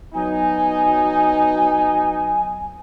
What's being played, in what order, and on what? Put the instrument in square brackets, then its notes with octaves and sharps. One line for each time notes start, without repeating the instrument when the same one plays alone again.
[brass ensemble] F#3 B3 D#4 [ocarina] G#5